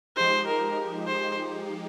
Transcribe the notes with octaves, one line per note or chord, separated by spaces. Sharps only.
F3 G#3 D#4 G4 C5
A#4
C5